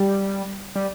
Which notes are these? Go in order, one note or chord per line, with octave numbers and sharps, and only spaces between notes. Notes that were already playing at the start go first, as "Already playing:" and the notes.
Already playing: G3
G3